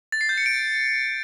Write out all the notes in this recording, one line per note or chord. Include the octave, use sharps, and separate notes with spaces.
A6
C7
G6
C#7
D7